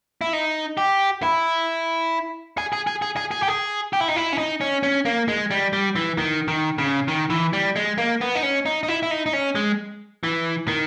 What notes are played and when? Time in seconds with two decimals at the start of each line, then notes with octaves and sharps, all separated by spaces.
0.21 E4
0.33 D#4
0.77 G4
1.23 E4
2.58 G#4
2.73 G#4
2.87 G#4
3.02 G#4
3.17 G#4
3.31 G#4
3.43 G4
3.48 G#4
3.93 G4
4.00 E4
4.08 D#4
4.16 E4
4.33 C#4
4.38 D#4
4.61 C#4
4.83 C#4
5.05 A#3
5.28 G#3
5.51 G3
5.73 G3
5.96 E3
6.18 D#3
6.48 D#3
6.78 C#3
7.08 D#3
7.30 E3
7.53 G3
7.76 G#3
7.98 A#3
8.21 B3
8.35 D#4
8.43 C#4
8.66 D#4
8.83 D#4
8.88 E4
9.03 E4
9.11 D#4
9.26 D#4
9.33 C#4
9.55 G#3
10.23 E3
10.68 D#3